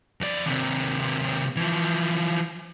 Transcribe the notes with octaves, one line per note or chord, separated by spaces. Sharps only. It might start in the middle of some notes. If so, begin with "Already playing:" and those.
F2 D5
D#2 C3
E3 F3